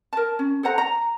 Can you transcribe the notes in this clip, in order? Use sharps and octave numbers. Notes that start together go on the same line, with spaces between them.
A#4 A5
C#4
A4 C5 F#5 A#5
A#5